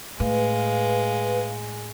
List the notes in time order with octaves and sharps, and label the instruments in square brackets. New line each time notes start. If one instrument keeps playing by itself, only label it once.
[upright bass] A2 [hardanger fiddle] G#3 [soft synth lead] B4 [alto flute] F5